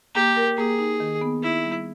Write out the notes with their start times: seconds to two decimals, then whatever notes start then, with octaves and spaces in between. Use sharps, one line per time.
0.15 A#3 G4
0.36 A#4
0.57 A#3 G#4
0.79 D#4
1.00 D#3
1.21 B3
1.42 D#4 E4
1.64 G3